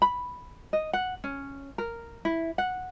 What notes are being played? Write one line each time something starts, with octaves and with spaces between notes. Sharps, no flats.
B5
D#5
F#5
C#4
A#4
E4
F#5